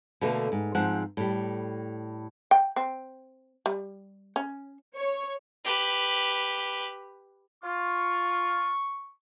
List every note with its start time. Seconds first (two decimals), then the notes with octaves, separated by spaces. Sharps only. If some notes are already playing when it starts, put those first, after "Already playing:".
0.21 B2 D3 A3 A#3
0.52 G#2
0.75 G#2 F3 C4 F#5
1.17 A2 G3
2.51 G5
2.76 C4
3.66 G3
4.36 C#4
4.96 C#5
5.65 G4 B4
7.64 F4 C#6